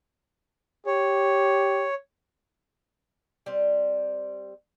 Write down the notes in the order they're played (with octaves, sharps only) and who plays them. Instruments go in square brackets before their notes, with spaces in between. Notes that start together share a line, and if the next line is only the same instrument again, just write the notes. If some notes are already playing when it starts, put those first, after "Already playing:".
[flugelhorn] G4 [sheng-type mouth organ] C#5
[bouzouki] G3 C4